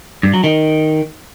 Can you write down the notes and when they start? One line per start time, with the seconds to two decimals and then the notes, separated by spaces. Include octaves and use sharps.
0.23 G2
0.34 F#3
0.44 D#3